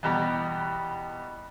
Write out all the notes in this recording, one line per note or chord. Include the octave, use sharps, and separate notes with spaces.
E2 B2 G3 G4 A#5